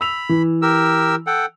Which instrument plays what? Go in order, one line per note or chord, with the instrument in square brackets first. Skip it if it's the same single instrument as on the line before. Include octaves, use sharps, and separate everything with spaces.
[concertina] B5 [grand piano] E6 F7
[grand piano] E3
[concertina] G4 A#4 E6
A4 F#5 G5